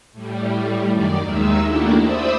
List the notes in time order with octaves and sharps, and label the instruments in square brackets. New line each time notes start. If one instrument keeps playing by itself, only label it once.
[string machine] A2 G3
F#2 D#3 D5
D#2 D#3 G#3 D#4 E5 E6
A3 A#3 D4 E4 F#4 G4
C5 D5 E5 B5 D#6 E6